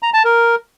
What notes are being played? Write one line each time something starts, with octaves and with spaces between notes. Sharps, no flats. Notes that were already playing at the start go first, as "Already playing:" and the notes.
A#5
A5
A#4